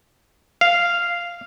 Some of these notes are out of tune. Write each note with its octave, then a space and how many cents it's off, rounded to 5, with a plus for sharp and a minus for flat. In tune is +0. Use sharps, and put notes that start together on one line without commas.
F5 -5